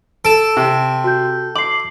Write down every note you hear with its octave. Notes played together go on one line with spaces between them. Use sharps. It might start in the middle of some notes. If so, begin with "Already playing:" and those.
A4 D7 E7
C3
F#4 G6
D6 C7 F#7